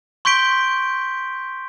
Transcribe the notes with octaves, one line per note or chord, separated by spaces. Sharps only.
C6 C#6 G6 B6 D7 G7